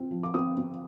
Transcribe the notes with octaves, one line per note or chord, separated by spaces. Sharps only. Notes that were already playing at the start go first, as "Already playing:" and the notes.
Already playing: C4 F4
F3
D6
C4 D#6
C4